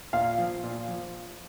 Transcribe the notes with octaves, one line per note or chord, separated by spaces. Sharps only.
A#2 F5
F3
A#2
F3